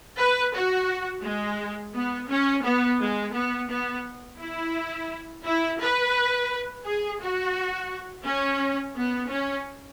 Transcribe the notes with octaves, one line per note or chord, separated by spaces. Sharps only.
B4
F#4
G#3
B3
C#4
B3
G#3
B3
B3
E4
E4
B4
G#4
F#4
C#4
B3
C#4